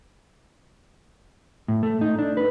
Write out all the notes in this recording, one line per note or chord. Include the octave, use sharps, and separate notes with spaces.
A2
A3
D#4
D4
B4